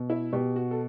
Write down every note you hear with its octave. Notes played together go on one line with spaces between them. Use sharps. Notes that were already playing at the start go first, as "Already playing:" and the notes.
Already playing: B2
E4
B2 G4
F#4
A4